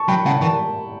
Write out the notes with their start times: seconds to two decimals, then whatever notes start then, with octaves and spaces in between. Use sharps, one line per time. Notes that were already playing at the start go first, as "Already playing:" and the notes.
Already playing: A5 C#6
0.08 F#3 G5 B5
0.25 C#3 F#5 A5
0.41 E3 A5 C#6